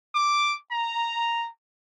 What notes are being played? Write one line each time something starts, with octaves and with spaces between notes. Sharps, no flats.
D6
A#5